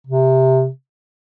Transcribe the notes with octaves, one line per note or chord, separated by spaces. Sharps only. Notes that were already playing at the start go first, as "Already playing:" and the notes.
C3